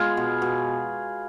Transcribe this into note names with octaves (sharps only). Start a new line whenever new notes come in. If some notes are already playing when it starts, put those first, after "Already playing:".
Already playing: G#3 B3 F4 G#4
B2
B2